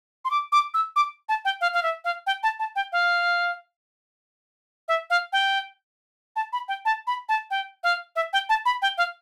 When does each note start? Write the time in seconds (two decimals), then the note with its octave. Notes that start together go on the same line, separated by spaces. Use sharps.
0.25 C6
0.31 D6
0.52 D6
0.74 E6
0.96 D6
1.29 A5
1.45 G5
1.61 F5
1.73 F5
1.83 E5
2.04 F5
2.27 G5
2.43 A5
2.59 A5
2.76 G5
2.92 F5
4.88 E5
5.10 F5
5.33 G5
6.36 A5
6.53 B5
6.68 G5
6.85 A5
7.07 B5
7.29 A5
7.51 G5
7.83 F5
8.16 E5
8.33 G5
8.49 A5
8.66 B5
8.82 G5
8.98 F5